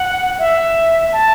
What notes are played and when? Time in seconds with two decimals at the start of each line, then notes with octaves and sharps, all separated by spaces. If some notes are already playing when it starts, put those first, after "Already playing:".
Already playing: F#5
0.39 E5
1.13 A5